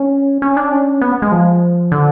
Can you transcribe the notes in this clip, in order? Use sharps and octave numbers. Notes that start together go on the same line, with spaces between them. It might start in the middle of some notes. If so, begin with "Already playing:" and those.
Already playing: C#4
C#4
D4
C#4
B3
G#3
F3
D3